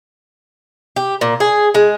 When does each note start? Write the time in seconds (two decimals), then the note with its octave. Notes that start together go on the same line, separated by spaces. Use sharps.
0.96 G4
1.21 A#2
1.40 G#4
1.75 G#3